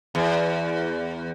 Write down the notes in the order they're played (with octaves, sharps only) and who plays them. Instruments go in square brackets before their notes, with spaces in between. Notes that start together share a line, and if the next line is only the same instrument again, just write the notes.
[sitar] E2